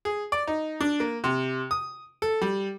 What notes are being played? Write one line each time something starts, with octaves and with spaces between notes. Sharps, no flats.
G#4
D5
D#4
D4
A#3
C3
D#6
A4
G3